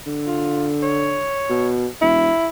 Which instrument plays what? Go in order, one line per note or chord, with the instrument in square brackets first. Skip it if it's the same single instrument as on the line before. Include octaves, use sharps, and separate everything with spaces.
[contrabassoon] D3
[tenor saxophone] F4
C#5
[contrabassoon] B2
[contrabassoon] E1 [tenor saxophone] E4